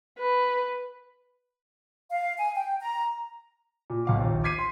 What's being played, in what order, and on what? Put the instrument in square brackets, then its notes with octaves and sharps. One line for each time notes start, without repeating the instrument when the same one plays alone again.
[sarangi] B4
[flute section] F5
G#5
G5
A#5
[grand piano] A#2
B1 F5 D6
A#1 D#2
D6 G#6 B6 C7 D#7
C6